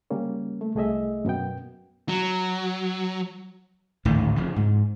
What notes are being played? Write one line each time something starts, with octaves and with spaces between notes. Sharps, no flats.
C#3 G3 A#3 C#4
A3
C2 A3 G#4 D#5 E5
F#2 B2 B3 G5
F#3
D1 A1 G#2 D#3
F2 C#3 F3
G#2